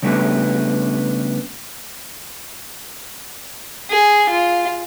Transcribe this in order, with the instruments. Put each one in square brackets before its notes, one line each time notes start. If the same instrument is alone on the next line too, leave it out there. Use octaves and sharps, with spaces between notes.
[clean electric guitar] C#3 G3 A3 B3 D4
[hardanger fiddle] G#4
F4